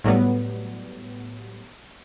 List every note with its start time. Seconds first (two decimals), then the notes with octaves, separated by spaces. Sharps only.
0.04 A2 F#3 G3 B3